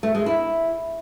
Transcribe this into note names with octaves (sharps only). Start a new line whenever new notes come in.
A3
G#3
E4